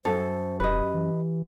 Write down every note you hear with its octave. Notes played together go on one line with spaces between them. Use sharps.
F#2 A4 C5
E1 G4 B4 D#5
E3